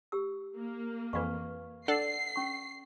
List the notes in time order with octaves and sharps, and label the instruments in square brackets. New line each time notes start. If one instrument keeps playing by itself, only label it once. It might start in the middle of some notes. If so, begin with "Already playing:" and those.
[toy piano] G4 E6
[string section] A#3
[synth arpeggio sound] F2 E3 [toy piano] B4 F5 C#6
[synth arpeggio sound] D4 A4 D5 [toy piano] F#5 [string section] C7
[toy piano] C#4 C#6